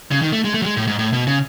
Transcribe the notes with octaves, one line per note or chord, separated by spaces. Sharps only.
C#3
D#3
A3
G#3
A3
F#3
G#3
A2
G#2
A2
B2
C#3